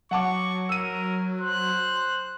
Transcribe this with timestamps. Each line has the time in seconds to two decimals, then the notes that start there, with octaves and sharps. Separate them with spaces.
0.11 F#3 F#5 A5 C#6 D6
0.69 A#4 E6 D#7
1.41 C5 F#6